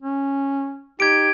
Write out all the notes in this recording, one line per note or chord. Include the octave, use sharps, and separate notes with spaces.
C#4
D#4 G4 G#6 D7